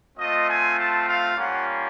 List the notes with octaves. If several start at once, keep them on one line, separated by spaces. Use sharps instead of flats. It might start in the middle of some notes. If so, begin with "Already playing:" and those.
A3 C4 F4 D#5
G#5
A5
F5
G3 A#3 C#4 F4 F#5